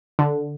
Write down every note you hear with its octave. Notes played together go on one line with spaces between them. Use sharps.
D3